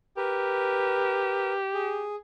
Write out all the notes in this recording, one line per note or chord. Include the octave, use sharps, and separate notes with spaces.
G4 A#4 B4
G#4